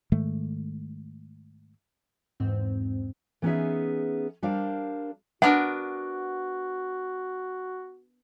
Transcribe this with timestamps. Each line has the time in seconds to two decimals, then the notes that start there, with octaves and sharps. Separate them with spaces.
0.12 G#2 D#3 G#3 A3
2.40 E2 G#2 C4
3.42 E3 B3 C#4 D#4 G#4 E5
4.42 G3 D4 A#4 C5 F5
5.42 B3 D4 F#4 A#4 F#5